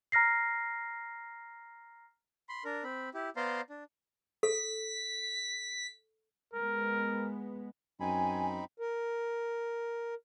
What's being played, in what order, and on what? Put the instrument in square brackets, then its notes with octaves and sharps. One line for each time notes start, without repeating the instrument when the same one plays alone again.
[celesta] A#5 F6 A#6 C7
[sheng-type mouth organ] B5 C6
D4 A#4
C4 B5
E4 G4
B3 C5 D5 F5 A#5 C6
D4
[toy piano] A4 [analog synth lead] B6
[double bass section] G#3 B3 [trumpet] A#4
[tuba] F#2 [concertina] C4 D#4 B5 [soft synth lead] G#5
[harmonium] A#4